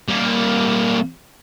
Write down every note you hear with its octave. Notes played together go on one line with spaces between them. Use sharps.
G3 A#3